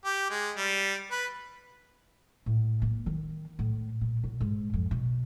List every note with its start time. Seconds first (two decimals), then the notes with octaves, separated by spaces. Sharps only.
0.05 G4
0.30 G#3
0.57 G3
1.11 B4
2.46 A2
2.82 A#3
3.06 D#3
3.59 A2
4.01 A#2
4.24 B2
4.40 G#2
4.73 F2
4.91 B2